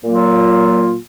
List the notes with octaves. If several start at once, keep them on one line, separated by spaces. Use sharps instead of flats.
A#2 F#3 A#3 F4